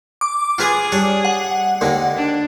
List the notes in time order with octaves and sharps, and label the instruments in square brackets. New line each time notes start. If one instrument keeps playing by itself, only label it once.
[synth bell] D6
[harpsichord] F4 B4 G#5 [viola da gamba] G#4
[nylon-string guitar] G3 [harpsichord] D4 C#5
[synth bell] F#5
[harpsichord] D#2 D3 G#3
[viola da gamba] D4